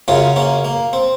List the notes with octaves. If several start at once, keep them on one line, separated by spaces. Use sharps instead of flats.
F#2 C#3 F#3 C#4 F4
A#3 C#4
A#3
C4